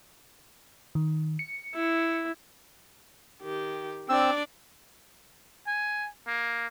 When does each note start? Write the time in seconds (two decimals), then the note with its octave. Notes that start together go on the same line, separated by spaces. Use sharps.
0.95 D#3
1.39 C#7
1.74 E4
3.42 D#3 G4
4.09 C4 D4 D5 E6
5.67 G#5
6.27 A#3